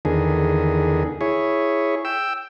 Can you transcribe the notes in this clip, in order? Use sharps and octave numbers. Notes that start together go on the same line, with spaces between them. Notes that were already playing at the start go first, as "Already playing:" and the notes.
E2 D3 D#3 G#4
E4 G#4 C#5
G5 E6